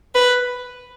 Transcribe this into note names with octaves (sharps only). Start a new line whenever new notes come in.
B4